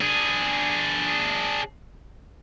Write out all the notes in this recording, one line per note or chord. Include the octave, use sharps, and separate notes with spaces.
D4 G#4